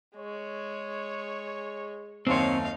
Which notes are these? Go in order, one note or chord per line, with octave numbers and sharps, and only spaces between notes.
G#3 C#5
F#1 D#2 C4 D#4 C#5 F5 C6